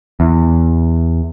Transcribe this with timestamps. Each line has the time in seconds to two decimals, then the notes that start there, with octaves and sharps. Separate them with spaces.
0.20 E2